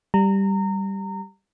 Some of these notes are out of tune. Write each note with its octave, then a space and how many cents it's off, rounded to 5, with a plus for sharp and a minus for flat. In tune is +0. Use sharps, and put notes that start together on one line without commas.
G3 +0 A#5 -25